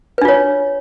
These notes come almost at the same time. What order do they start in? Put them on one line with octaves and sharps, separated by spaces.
B4 D4 F4 C#5